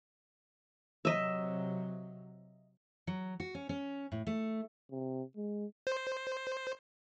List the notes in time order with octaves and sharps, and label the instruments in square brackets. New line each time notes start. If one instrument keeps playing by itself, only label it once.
[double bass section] C3 F#3 [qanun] D#5 E5
[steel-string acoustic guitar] F#3
F#4
C#4
C#4
A2
A3
[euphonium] C3
G#3
[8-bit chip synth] C5